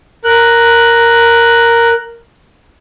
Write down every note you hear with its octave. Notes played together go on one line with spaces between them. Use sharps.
A#4 F#6